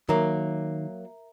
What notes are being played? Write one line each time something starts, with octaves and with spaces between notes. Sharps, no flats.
D#3 F#3 A#3 A#4 E5 A#5